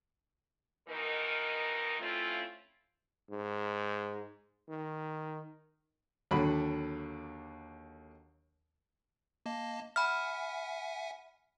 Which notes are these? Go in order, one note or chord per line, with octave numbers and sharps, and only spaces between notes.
B2 D#3 E3 D#4 A#4
A3 C4 C#4 E4 F4
G#2
D#3
D#2 D3 F#3 B5
A#3 D#5 A5
E5 F#5 G#5 B5 F6